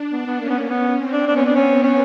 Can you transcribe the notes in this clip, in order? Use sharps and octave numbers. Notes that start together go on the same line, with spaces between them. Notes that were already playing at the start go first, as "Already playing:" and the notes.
Already playing: D4
B3 D4
B3
A#3 C#4
B3
A#3
B3
C4
D4
B3 D4
C#4
D4
C#4
C#4